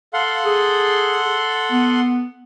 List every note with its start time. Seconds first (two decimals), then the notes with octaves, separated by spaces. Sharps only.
0.14 A4 F5 F#5 C6
0.45 G#4
1.72 B3